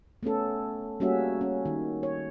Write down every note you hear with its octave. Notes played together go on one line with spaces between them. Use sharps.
A3 B3 C#4 A4
G3 A#3 C#4 F#4 G#4 E5
C#4
D#3
C#5